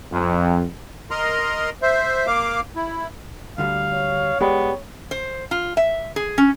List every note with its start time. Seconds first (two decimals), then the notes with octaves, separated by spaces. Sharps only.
0.12 F2
1.11 A#4 D#5 A#5 C6
1.82 C5 E5
2.27 A#3 F5 D6
2.76 E4
3.58 D2 D3 G3 F5
3.92 C#5
4.41 G#3 B3 G4 D5 B5
5.11 C5
5.51 F4
5.77 E5
6.16 G#4
6.38 C#4